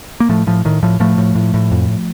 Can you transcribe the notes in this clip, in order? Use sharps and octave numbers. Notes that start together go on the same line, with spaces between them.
A#3
A2 F3 A3
A2 F3
A2 D#3
A2 F3
A2 F3 A3
A2
A2
A2
F2